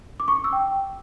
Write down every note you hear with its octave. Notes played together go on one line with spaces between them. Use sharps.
D6
C#6
D6
E6
G5